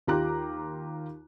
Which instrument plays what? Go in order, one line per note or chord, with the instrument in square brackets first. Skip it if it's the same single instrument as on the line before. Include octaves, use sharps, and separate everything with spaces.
[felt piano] D#2 F4 G4 A#5 D6 F#6